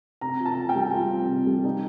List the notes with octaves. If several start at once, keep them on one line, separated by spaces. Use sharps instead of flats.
C3 A#5
F4
A5
F4
G5
G3
F4
C4
C3
G3
D#4